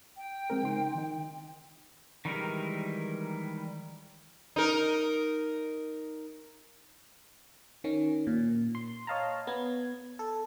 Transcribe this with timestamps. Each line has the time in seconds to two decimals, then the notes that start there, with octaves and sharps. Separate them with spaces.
0.16 G5
0.50 G#3 C4 A#4
0.63 C#3 D#4 C6
0.95 D#3 D#4
2.25 D#3 E3 G3 G#3 A#4
4.56 D#4 A#4
7.84 D#3 C#4
8.27 A#2
8.75 C6
9.07 C#5 D#5 F5 A5 A#5
9.47 B3 G#6
10.19 A4